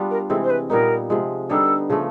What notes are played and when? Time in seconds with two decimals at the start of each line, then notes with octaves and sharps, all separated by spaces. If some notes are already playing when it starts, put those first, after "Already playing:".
Already playing: G3 B3 D4 F4
0.10 A#4
0.30 C3 E3 G#3 C4 A4
0.43 C5
0.50 B4
0.70 A#2 G3 B3 D#4 A#4
1.10 C3 F3 G#3
1.50 D3 G3 B3 D#4 A4
1.90 C#3 F3 A3